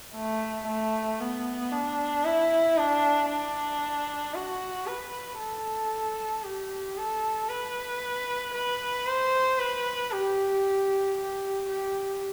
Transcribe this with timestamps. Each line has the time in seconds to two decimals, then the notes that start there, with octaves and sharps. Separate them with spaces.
0.15 A3
0.67 A3
1.20 B3
1.72 D4
2.25 E4
2.77 D4
3.30 D4
4.35 F#4
4.87 B4
5.39 A4
6.44 G4
6.97 A4
7.49 B4
8.54 B4
9.06 C5
9.59 B4
10.12 G4
11.17 G4
11.69 G4